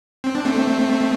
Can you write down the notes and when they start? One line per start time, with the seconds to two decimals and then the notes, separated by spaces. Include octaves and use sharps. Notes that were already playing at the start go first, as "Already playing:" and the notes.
0.24 C4
0.35 D4
0.45 A3 C4